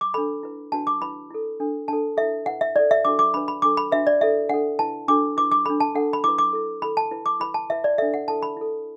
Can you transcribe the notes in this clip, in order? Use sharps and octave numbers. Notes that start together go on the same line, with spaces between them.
D6
D4 A4 B5
E4 B4
D4 F#4 B4 A5
D6
E4 B4 B5
E4 A4
D4 A4
D4 A4 A5
E4 A4 E5
E4 B4 F#5
E5
E4 A4 D5
E5
D4 F#4 A4 D6
D6
D4 B4 B5
B5
D4 A4 D6
B5
D4 F#4 B4 E5
D5
E4 A4 E5
D4 A4 F#5
E4 B4 A5
D4 F#4 A4 D6
E4 B4 D6
D6
D4 A4 B5
A5
D4 A4 F#5
B5
E4 B4 D6
D6
E4 A4
E4 A4 B5
A5
E4 B4
D6
E4 B4 B5
A5
E4 B4 E5
D5
D4 A4 E5
F#5
E4 A4 A5
B5
E4 A4